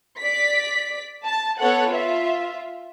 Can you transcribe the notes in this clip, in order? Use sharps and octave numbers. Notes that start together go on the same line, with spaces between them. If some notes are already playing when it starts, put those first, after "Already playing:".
D5 B6
A5
B3 A4 C#5 F#5
F4 E5